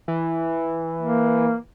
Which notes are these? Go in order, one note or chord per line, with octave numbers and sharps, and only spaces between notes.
E3
A#3